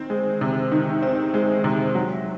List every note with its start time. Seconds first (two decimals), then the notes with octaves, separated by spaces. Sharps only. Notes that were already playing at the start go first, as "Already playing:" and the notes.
Already playing: D#3 C4
0.10 G#3
0.41 C3
0.72 D#3
1.02 C4
1.34 G#3
1.64 C3
1.95 F#3